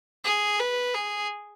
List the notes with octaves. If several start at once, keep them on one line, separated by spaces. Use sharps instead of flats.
G#4
B4
G#4